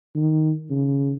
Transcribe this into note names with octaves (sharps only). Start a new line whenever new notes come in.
D#3
C#3